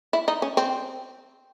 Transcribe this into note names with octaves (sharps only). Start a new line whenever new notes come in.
E4
D#4
C#4
C4